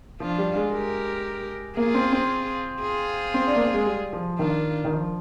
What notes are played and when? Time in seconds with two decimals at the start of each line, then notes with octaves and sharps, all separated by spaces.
0.20 F3 D4 F4
0.38 G3
0.56 G#3
0.73 G4 A#4
1.77 A#3 F4 G#4
1.95 C4
2.13 C4
2.81 F4 G#4
3.34 C4
3.47 D4
3.56 A#3
3.61 C4
3.74 G#3
3.86 G3
4.13 F3
4.38 D#3 D4 F4
4.85 D#3
4.92 F3